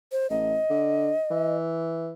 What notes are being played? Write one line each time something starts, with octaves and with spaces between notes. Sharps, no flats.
C5
A1 D#5
D3
E3